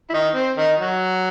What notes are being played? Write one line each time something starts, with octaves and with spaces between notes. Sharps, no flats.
E4
D#3 D#4
C4
D#3 D#4
F#3 F#4